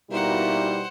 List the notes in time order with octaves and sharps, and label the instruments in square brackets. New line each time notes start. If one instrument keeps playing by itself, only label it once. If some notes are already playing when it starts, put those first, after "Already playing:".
[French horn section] B2 G3 E4 [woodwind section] A#3 D#4 F#4 [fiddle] C5 F#5